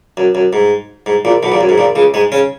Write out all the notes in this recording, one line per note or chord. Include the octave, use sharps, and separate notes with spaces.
F#2
F#2
G#2
G#2
A#1 A#2
B1 B2
A#1 A#2
F#2
G#2
A#1 A#2
C#2 C#3
G#2 G#3
C#3 C#4